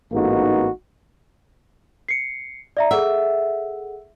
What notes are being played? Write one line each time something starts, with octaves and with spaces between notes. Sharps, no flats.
A1 G#2 A#3 B3 D#4 F#4
C7 C#7
D5 E5 A#5
G#4 A4 E5 F#5